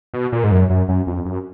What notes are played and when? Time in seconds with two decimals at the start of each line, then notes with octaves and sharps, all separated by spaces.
0.14 B2
0.32 A#2
0.44 G#2
0.52 F#2
0.70 F#2
0.89 F#2
1.07 F2
1.25 F#2